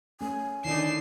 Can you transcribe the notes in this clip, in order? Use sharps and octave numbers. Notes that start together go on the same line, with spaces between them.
A3 C#4 G#5
D3 D#3 D#4 E4 D5 C7 E7